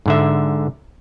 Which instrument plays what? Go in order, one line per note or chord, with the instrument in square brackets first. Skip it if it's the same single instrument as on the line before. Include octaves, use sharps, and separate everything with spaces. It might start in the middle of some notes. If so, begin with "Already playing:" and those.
[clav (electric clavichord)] G#2 D3 E5